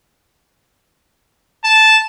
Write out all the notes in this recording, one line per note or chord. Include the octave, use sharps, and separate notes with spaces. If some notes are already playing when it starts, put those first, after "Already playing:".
A5